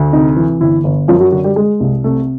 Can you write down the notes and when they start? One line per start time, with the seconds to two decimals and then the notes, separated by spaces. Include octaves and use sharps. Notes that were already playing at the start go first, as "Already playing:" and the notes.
Already playing: D2
0.13 C3 D#4
0.36 E3
0.60 G1 E4
0.84 G1
1.08 F#2 F3 F4
1.20 F#3 F#4
1.32 D3 F#3 F#4
1.44 G3 G4
1.56 G#3 G#4
1.80 C2
2.04 C3 A3 A4